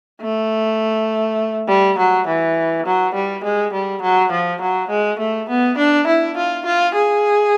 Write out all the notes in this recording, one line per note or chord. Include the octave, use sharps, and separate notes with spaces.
A3
G3
F#3
E3
F#3
G3
G#3
G3
F#3
F3
F#3
G#3
A3
B3
D4
E4
F4
F4
G#4